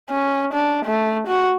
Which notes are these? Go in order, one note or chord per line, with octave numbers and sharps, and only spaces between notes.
C#4
D4
A3
F#4